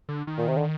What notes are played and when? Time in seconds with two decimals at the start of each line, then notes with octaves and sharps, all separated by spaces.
0.09 D3
0.27 D#3
0.38 A#2
0.48 C3
0.57 D3